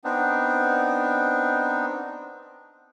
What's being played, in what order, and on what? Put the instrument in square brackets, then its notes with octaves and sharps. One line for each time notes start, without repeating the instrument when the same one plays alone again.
[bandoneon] B3 C4 D4 D#4